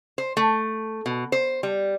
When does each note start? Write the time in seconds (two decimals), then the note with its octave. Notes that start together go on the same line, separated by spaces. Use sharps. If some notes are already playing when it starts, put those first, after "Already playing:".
0.18 C5
0.37 A3
1.06 B2
1.32 C5
1.63 G3